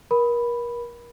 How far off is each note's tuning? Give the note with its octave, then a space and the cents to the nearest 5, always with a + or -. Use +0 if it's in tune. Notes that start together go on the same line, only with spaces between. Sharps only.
A#4 +35 B5 +0